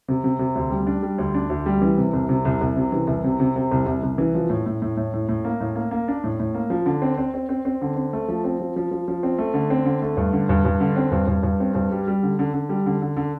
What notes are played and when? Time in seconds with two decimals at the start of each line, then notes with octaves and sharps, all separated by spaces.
0.08 C3
0.24 C3
0.39 C3
0.55 D2
0.71 G3
0.87 D4
1.03 G3
1.18 D2
1.34 D4
1.50 D2
1.66 G3
1.82 E3
1.97 C3
2.13 C2
2.29 C3
2.45 C2
2.61 C2
2.76 C3
2.92 E3
3.07 C2
3.24 C3
3.40 C3
3.56 C3
3.72 C2
3.86 C2
4.03 C2
4.18 E3
4.35 F3
4.50 A2
4.66 A2
4.82 A2
4.97 A2
5.13 A2
5.29 A2
5.45 A#3
5.60 A2
5.75 A#3
5.91 A#3
6.08 D4
6.24 A2
6.40 A2
6.54 A#3
6.70 F3
6.86 D3
7.02 C4
7.18 C4
7.34 C4
7.49 C4
7.65 C4
7.82 D3
7.96 C4
8.13 A3
8.28 F3
8.44 C4
8.60 F3
8.76 F3
8.91 F3
9.08 F3
9.23 C4
9.38 A3
9.54 D3
9.70 C4
9.85 D3
10.02 A3
10.17 G2
10.33 D3
10.49 G2
10.65 G2
10.80 D3
10.96 C4
11.12 G2
11.27 G2
11.43 G2
11.60 C4
11.75 G2
11.91 G3
12.07 G3
12.23 D3
12.39 D3
12.54 D3
12.69 G3
12.86 D3
13.02 D3
13.17 D3